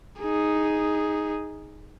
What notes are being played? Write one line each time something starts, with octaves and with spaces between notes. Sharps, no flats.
D#4 G#4